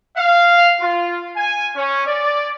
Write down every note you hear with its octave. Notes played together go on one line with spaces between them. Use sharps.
F5
F4
G#5
C#4
D5